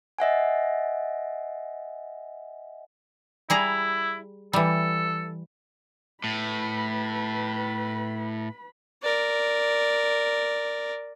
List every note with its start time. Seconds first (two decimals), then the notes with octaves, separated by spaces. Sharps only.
0.19 D#5 E5 F#5 G#5
3.50 G3 E4 G#4 A#5
4.53 E3 G3 A4
6.24 A2 B4 B5
9.03 A#4 D5